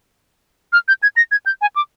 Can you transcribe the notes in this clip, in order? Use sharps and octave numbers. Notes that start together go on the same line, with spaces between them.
F6
G6
G#6
A#6
G#6
G6
G#5
D6